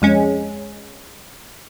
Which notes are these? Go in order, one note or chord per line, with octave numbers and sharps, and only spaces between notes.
F2 G#3 C#4